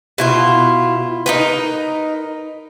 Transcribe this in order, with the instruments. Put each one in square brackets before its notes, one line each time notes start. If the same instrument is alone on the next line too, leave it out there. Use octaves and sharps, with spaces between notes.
[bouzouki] B2 E4 F4
D#4 A#4 B4